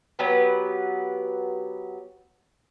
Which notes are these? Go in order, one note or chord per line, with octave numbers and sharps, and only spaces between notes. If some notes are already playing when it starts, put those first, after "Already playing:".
F#3 B3 G4 B4